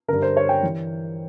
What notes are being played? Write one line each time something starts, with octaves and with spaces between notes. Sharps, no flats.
G2 D3 A#4
C5
C#5
G5
E3